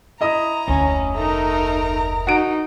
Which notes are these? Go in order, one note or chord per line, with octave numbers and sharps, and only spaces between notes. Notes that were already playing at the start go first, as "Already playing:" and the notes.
E4 D#5 A#5 D#6
F1 D2 C#4
A3 D#4 A#4 A#5
D#4 F#4 D7